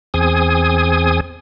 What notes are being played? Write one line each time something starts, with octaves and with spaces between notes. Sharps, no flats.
E2 C4 G#4 G#5 D#6